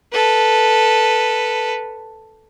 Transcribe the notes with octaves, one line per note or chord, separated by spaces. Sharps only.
A4 B4